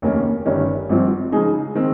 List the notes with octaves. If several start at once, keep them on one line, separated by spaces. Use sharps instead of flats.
F1 D#2 D#3 A#3 C#4
G1 G2 D#3 G3 C#4
G#1 G2 F3 C4
C#3 F3 G#3 D#4 G#4
D#3 G#3 C4